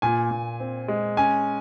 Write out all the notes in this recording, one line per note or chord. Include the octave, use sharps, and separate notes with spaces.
A#2 G#5
A#2
C4
G#3
C#4 G#5